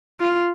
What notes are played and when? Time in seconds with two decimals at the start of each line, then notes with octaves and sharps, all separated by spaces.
0.20 F4